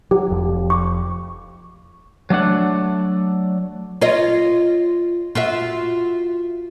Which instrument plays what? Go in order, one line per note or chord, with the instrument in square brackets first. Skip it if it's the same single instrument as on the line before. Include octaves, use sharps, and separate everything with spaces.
[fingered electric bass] F#3 [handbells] G4
[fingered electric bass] F1 F2 F3
[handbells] C#6 D6
[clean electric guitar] F#3 A3 D4 F#5
[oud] F4 C#5 D#5
F4 F#4 E5